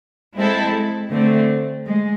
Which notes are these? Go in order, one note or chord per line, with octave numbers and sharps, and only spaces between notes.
G#3 C4 E4 A4
D3 A3 C4
G#3